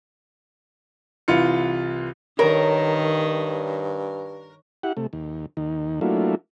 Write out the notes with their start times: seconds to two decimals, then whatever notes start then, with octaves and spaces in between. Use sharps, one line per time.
1.28 C2 E3 F4 C#7
2.39 G2 D#3 A#4 C#5
4.83 E4 G4 F#5
4.97 C3 A3
5.13 D#2
5.57 D#2 D#3
6.01 F#3 A3 A#3 D4 E4 F4